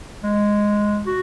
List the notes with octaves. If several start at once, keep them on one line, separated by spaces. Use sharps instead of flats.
G#3
F#4